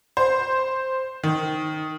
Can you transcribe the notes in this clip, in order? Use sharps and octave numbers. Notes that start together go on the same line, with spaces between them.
C5
D#3